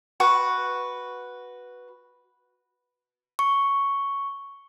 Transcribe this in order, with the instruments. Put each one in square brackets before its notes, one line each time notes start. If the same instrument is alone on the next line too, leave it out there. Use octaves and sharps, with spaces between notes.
[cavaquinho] F#4 B4 C#6
[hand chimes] C#6